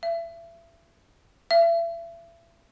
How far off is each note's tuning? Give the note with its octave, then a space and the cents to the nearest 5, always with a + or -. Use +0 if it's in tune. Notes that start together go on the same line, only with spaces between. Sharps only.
E5 +30
E5 +35